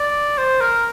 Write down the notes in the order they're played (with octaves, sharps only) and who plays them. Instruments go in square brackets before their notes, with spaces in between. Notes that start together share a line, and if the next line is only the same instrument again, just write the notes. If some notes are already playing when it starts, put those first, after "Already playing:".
Already playing: [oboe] D5
C5
A#4